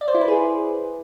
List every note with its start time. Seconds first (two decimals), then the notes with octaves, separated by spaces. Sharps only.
0.01 D5
0.08 C5
0.15 E4
0.21 B4
0.28 G#4